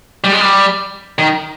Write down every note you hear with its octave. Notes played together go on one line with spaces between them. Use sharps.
G3
G#3
G3
D#3